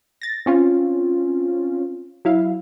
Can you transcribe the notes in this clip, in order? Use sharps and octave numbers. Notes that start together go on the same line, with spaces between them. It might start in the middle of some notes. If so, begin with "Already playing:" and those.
A6 A#6
C4 C#4 F4
F#3 E4 F5